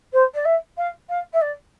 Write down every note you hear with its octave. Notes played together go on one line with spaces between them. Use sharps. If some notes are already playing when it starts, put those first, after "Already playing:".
C5
D5
E5
F5
F5
E5
D5